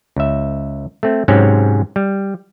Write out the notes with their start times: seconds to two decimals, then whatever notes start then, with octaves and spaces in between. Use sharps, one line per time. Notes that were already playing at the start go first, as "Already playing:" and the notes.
0.17 C#2 E5
1.03 A3 C4
1.28 G#2 C3 F#3 C4 C#4
1.96 G3